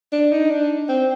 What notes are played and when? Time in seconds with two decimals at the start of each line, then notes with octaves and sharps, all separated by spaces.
0.12 D4
0.32 D#4
0.51 D4
0.89 C4